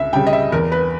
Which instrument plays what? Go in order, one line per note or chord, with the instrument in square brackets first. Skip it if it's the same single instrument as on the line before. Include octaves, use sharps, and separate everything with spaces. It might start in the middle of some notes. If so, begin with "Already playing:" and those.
Already playing: [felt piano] C#2 E5
C#3 G3 G5
D#5
E5
E2 A#4
B4